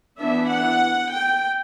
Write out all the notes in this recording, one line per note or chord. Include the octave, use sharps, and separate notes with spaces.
E3 B3 D4 E5
F#5
G5